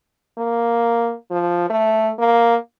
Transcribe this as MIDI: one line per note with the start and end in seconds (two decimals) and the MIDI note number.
0.38 1.14 58
1.30 1.69 53
1.70 2.11 57
2.19 2.55 58